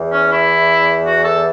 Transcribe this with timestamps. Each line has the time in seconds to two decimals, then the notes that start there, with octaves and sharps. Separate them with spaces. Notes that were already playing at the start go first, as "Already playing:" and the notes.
Already playing: E2 E3
0.12 C#4
0.30 E4
1.05 F#4
1.23 A4